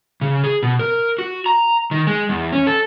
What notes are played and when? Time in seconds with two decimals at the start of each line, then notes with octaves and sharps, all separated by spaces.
0.21 C#3
0.44 G#4
0.63 B2
0.79 A#4
1.19 F#4
1.46 A#5
1.91 D#3
2.07 G#3
2.29 E2
2.52 C#4
2.67 A4